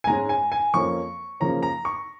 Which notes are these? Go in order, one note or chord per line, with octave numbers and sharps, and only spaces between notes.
G#5
G#2 G#3 C#4 A#5
G#5
G#5
F2 F3 A#3 C#4 C#6
C#3 F3 A#3 C#4 A#5
A#5
C#6